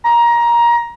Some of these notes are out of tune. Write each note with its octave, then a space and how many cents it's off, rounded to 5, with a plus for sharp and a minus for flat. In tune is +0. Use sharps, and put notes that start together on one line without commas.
A#5 +20